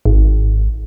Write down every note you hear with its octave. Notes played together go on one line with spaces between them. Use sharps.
G#1